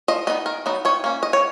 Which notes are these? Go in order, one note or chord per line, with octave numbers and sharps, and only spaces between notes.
F3 D#5
B3 D#4 D#5
D#3 A#4
F#3 B3 D#4
D#3 C#5
A#3 C#4
D#3 D#5
C#5